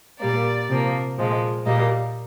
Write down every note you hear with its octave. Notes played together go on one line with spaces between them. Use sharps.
A#2 G3 A#3 D5
C3 F3 A#3
A#2 F3 G#3
A#2 G3 A#3 D#5